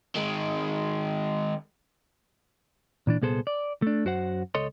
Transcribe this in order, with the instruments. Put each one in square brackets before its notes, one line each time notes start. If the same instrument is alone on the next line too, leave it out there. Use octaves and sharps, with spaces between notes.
[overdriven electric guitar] D#3 G#3
[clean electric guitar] A#2 E3 D4
C2 A#2 B3 G#4 A4 C5
D5
A3 D4
F#2 F#4 C5 F#5
C#2 A4 C#5 D#5 C6